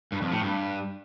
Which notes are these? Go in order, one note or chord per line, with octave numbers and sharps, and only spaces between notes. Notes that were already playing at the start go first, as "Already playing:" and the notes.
G2
F2
A2
G2